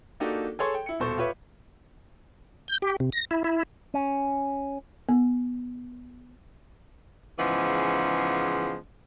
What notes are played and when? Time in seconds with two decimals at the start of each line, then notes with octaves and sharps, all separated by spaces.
0.20 A#3 D4 D#4 F#4 G4 A4
0.59 G#4 A4 C#5 C6
0.75 G5
0.86 E4 C#7
1.00 D#1 B2 A4 C5 C#6
1.17 F4 G4 B4 C#5 E5
2.68 G6
2.82 G4
3.00 C3
3.12 A#6
3.31 E4
3.44 E4
3.94 C#4
5.09 B3
7.38 G#2 C#3 E3 F3 G#3 B3